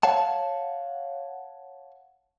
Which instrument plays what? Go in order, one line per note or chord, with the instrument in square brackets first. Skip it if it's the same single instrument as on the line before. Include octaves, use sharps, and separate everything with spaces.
[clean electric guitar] C#5 F5 F#5 A5